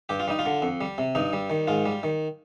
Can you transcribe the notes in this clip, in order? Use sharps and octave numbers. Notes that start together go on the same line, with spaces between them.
G2 G4
F4
G3 D#4
F4
D3
F2
G3
C3
G2 D#4
G3
D#3
G#2 F4
G3
D#3